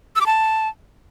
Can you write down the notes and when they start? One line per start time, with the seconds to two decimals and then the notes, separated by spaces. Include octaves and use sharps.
0.16 E6
0.21 D6
0.26 A5